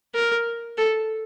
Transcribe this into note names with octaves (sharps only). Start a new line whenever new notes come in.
A#4
A4